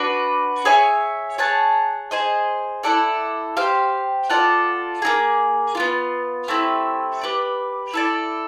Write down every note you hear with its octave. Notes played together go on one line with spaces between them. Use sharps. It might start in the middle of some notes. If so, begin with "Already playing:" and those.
Already playing: D4 F#4 B4 D5
G#4 C#5 E5 G#5
G#4 C#5 F#5 A5
G#4 C5 D#5
E4 A4 D5 F#5
G4 C5 F5
F4 A4 D5 F#5
A#3 D#4 G#4
B3 D4 F4
A3 C4 E4 G4
G4 B4 D5
E4 A4 D5